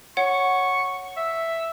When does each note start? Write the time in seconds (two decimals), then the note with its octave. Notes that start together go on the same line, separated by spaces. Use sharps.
0.17 C#5 F#5 C#6
1.17 E5